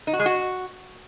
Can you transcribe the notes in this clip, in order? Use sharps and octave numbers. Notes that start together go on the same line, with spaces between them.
D#4
F#4
G#3
F#4